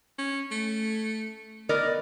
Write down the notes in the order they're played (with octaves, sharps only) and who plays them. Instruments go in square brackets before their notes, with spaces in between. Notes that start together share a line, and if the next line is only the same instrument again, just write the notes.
[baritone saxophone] C#4
A3
[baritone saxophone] B3 [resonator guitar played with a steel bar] A#4 D5 D#5